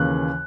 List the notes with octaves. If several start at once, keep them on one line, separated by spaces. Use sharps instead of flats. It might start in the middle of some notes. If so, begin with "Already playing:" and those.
Already playing: D#2 C#3 E3 A#3 C#4 F#6